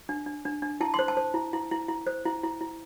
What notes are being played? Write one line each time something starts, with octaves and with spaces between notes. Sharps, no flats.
D4
D4
D4
D4
E4 A5
C5 C6
A5
C5
E4
E4
E4
E4
C5
E4
E4
E4